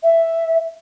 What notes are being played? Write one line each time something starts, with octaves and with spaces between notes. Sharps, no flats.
E5